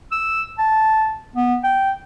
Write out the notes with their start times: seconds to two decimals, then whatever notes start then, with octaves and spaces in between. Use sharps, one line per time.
0.12 E6
0.58 A5
1.36 B3
1.64 G5